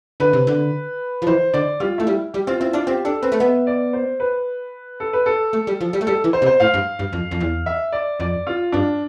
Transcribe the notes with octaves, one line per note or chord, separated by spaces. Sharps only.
D3 B4
C3
D3
F3
E3 C5
D3 D5
G3 F4
A3 E4
G3
G3 G4
C4 F4
C4 E4
D4 F4
C4 G4
D4 A4
C4 B4
A3
B3 E5
D5
C5
B4
A4
B4
A4
A3
G3
F3
G3
A3
G3 A4
E3
C5
C3
C5
A2 F5
G2
G2
F2
F2
E2
E5
D5
F2 D5
F4
G2 D4